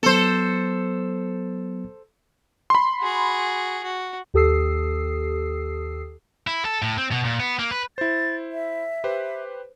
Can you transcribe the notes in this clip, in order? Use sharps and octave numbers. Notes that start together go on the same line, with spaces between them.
F#3 B3 A4 C5
B5 C6
F#4 G#4
F#4
D#2 G4 A4 D#6 E6 C7
E4
A4
A2
C4
B2
A#2
B3
A#3
B4
E4 C5 A6
E5
G4 B4 C5